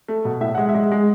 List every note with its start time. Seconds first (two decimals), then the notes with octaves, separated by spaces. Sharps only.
0.08 A3
0.25 B2
0.41 A2 E5
0.55 G#3 F#5
0.69 E5
0.75 G#3
0.92 G#3